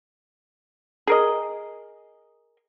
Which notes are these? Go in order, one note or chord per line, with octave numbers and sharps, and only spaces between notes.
G#4 A#4 D#5